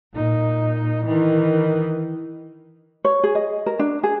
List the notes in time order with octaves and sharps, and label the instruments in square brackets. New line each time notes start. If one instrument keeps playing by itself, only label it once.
[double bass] A#2 D#4
D#3 E3
[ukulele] C#5
G#4
D#5
A#4
D4
G#4